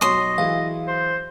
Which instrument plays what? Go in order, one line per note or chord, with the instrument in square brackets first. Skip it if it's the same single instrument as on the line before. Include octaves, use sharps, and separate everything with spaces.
[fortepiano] B1 F#4 C#5 [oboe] D#5 [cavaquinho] C6 D#6 [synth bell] C#6
[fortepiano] E3 F#3 G#4 [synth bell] F5
[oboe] C5